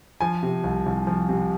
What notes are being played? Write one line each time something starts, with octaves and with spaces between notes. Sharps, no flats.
F3 G#5
C3
C2
C2
F3
C3